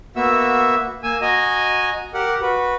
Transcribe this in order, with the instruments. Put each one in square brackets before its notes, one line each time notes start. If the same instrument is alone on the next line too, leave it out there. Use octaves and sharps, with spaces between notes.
[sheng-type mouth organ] A#3 B3 F#4 E5 E6
A#3 G#5 E6
F#4 D#5 G#5 A#5
G4 A#4 F#5
F#4 B4